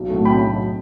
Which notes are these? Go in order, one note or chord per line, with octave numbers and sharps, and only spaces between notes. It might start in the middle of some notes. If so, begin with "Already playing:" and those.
Already playing: B1
A2 F#3 A3
B1 G5 B5
A2 F#3 A3